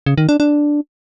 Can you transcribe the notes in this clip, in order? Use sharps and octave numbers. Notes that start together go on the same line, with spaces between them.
C#3
D#3
D4
D4